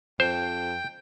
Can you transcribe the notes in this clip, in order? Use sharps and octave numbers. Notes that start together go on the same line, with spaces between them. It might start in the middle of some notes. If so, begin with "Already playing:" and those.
F2 C5 G5 G6